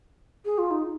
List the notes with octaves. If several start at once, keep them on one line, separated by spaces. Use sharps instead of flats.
G#4
F4
D#4